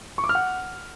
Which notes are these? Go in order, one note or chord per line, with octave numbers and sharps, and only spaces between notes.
C#6
D6
F6
F#5